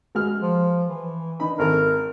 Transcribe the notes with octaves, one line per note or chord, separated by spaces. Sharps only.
G#3 F#4 F6
F3
E3
D4 D#4 B5
G#1 A4 A#4